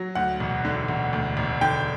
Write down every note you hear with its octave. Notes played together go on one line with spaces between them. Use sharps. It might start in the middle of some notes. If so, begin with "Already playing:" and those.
Already playing: F#3
D2 F#5
E1
D3
E1
D2
E1
D3 G5